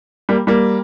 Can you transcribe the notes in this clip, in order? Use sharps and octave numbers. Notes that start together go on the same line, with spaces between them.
G3 A#3
G3 A#3